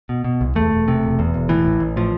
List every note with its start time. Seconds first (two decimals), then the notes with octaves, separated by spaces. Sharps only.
0.09 B2
0.24 B2
0.41 C2
0.55 E2 A3
0.72 E1
0.88 C3
1.03 E1
1.19 E2
1.34 E1
1.49 A2 E3
1.64 A1
1.80 A1
1.97 A2 F3